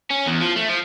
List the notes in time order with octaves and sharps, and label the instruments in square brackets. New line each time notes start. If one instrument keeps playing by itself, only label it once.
[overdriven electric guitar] C#4
E2
F3
A3
F3